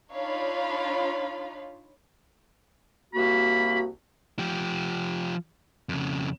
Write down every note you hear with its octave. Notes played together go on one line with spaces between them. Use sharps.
D4 D#4 F4 C#5 F5 B5
C2 A#3 F#4 B5
F3 G4
F2 C#3